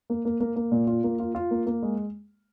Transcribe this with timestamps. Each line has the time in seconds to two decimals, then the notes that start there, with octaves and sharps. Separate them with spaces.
0.10 A#3
0.25 A#3
0.40 A#3
0.56 A#3
0.72 A#2
0.87 F4
1.04 A#3
1.20 F4
1.35 F4
1.51 A#3
1.66 A#3
1.83 G#3